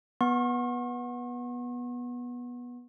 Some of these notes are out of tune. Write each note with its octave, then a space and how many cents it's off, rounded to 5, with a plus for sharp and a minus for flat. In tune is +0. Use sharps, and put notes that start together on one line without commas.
B3 -15 C#6 -45